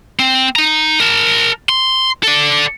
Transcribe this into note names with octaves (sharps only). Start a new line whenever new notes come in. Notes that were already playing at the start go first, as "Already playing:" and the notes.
C4
D#4 A#5
A#4 A5
C6
A4 D5